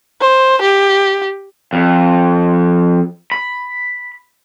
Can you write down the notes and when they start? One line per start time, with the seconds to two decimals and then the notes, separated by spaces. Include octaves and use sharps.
0.21 C5
0.62 G4
1.73 F2
3.32 B5